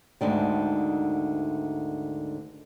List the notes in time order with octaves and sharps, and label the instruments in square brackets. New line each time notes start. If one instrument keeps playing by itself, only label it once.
[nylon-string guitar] D2 G#2 D3 D#3